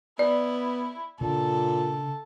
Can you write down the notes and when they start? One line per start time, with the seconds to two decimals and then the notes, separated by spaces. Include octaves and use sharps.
0.19 B3 E4 D5
1.21 A#2 C#3 D4 A4